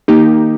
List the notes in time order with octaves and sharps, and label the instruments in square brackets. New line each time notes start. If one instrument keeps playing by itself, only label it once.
[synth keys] D#3 A#3 D#4 G4